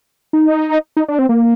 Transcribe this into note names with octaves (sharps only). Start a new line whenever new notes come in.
D#4
D#4
D4
C4
A#3